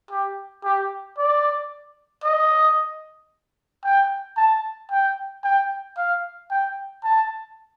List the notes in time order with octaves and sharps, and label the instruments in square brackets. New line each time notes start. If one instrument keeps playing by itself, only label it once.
[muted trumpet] G4
G4
D5
D#5
G5
A5
G5
G5
F5
G5
A5